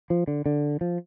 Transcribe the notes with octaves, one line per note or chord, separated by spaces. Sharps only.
F3
D3
D3
F3